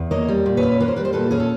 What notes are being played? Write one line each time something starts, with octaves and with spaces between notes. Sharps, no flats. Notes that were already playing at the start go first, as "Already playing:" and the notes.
Already playing: E2
A#3 C#5 D#5
G3
A#2
B4 C#5
C#4
A#3 B4
C5
G3 B4
C5
A#2 A4 B4
C#4 G#4
A4